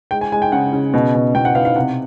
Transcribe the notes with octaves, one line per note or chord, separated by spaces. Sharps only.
G#3 G5
G#5
G#3 G#5
G5
C#3 F#5
C#3
B2
B2
B2 G5
F#5
B3 F5
F5
C3 F#5